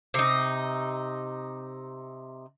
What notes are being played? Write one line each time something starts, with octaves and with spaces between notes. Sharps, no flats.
C3 D#4